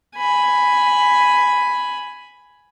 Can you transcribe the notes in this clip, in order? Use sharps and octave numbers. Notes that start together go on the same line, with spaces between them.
G#5 B5